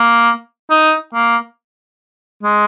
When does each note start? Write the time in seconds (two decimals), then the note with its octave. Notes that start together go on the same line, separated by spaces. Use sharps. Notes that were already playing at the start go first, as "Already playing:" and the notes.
Already playing: A#3
0.70 D#4
1.14 A#3
2.43 G#3